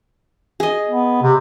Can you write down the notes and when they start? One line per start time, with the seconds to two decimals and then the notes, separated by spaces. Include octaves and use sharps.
0.60 G#4 D#5
0.89 B3
1.22 C3